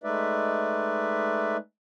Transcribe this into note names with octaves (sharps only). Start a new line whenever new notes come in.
G#3 A3 D#4 B4 D5 E5